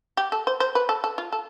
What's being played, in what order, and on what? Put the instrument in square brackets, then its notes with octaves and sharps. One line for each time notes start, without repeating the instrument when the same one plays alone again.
[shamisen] G4
A4
C5
C5
B4
A4
A4
F4
A4